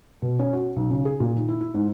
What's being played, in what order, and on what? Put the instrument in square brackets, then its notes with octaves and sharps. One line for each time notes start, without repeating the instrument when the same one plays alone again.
[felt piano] B2
C#4
F#4
B1
C#3
G#4
A#2
D#3
E4
E4
G#2